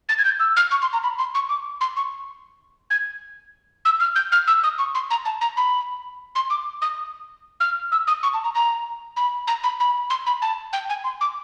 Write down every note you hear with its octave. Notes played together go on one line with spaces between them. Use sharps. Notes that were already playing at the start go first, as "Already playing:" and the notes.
A6
G#6
G6
E6
F6
C#6
C6
A#5
B5
C6
C#6
D6
C6
C#6
G#6
E6
F6
G6
F6
E6
D#6
C#6
C6
A#5
A5
A#5
B5
C6
D6
D#6
F6
E6
D#6
C#6
A5
A#5
A#5
B5
A#5
B5
B5
C6
B5
A5
G5
G#5
C6
D6